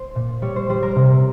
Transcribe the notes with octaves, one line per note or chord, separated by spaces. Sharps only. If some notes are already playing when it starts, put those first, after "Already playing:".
Already playing: C5
A#2
G3 C#5
C5
G3 C5
A#4
C3 C5